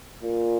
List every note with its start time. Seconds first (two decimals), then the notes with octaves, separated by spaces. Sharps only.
0.23 A#2